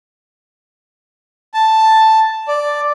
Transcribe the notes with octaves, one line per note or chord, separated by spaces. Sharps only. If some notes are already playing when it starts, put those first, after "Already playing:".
A5
D5